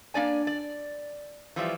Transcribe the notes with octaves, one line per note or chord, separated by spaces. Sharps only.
A#3 D4 D5 G#5
D5
E3 F3 G3 E5